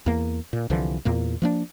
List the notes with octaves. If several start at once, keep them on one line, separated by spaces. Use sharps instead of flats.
E2 A#3
A#2
C2 D3 E3 F3
E2 A#2 A#3
F3 A#3 D4